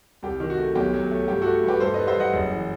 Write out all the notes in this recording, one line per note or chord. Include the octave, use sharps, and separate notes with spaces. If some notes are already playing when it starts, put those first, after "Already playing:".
C2 G4
D#3
F#4
A3
B1 G4
F#3
A3
G2 G4
A3 F#4 A4
G2 G4 B4
G2 A4 C5
G3 B4 D#5
C5 E5
G2 D#5 F#5
F#1
E3